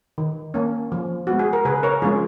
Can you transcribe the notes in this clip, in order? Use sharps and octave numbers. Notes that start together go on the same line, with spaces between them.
D#3
A#3 C#4
F3
G#3 B3 F#4
G#4
A#4
C#3 G#4 B4
A#4 C#5
F3 G#3 C#4 F4 G#4